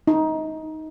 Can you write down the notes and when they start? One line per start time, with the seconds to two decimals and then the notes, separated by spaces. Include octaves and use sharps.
0.07 D#4